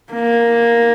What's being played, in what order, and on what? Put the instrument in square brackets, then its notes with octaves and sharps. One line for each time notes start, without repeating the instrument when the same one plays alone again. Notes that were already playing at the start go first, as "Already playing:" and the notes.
[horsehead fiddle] A#3